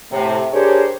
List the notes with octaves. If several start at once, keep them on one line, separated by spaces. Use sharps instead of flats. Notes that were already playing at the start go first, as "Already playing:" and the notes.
A2 C3
D4 G4 G#4 A#4 C5 C#5